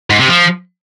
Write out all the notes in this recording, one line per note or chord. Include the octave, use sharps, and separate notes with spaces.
G#2
C3
F3